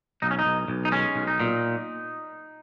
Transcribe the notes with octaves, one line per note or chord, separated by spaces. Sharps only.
B1 D#4
C#4
D#4
B1
B1
D#4
G#3 C#4
B1
D#4
A#2